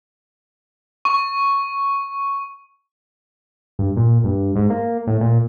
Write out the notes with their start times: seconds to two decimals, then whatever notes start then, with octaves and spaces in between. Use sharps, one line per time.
1.05 C#6
3.79 G2
3.96 A#2
4.24 G2
4.56 G#2
4.70 A#3
5.07 A2
5.21 A#2